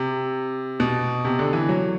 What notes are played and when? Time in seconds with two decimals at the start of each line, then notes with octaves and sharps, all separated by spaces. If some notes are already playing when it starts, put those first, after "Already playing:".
Already playing: C3
0.80 B2
1.25 C3
1.39 D3
1.53 E3
1.69 F#3